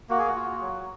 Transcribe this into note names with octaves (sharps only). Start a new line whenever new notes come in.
A#3 F#4
G#4
F#4
F4
F#3